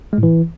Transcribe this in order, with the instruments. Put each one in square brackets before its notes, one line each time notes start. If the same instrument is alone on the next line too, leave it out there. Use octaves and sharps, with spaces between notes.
[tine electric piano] G#3
A2
E3